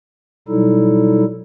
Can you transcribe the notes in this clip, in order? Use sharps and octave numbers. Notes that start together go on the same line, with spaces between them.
B2 F#3 G3 D#4 E4 A4